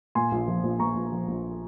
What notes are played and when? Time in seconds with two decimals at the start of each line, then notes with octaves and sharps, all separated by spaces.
0.15 A#2 G#5 C6
0.32 A#1
0.48 F3
0.63 A#1
0.80 A#2 A#5 C#6
0.95 A#1
1.12 F3
1.28 A#1